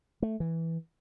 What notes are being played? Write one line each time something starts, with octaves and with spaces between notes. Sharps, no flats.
A3
E3